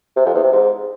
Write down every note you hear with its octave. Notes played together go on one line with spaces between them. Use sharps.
C3
F2
E2
C3
G#2